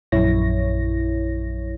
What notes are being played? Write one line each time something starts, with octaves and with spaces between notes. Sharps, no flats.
A#1 F#2 E4 C#5 A#6